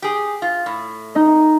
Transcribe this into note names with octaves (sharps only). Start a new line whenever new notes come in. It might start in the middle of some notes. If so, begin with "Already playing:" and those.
G4 G#4
F4
A2
D#4 D#5